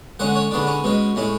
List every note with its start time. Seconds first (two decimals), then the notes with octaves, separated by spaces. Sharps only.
0.19 D3 G#3 C#4 F#5
0.35 C#5
0.51 D3 G#3 B3 D4
0.67 C#4
0.84 B2 G#3 C#4
1.15 A2 G#3 C#4